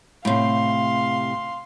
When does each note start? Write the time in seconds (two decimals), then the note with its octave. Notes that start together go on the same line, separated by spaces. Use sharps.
0.25 A2 C3 F5 C6